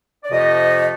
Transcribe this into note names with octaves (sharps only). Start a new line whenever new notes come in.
D5
F2 C3 F3 A3 D#5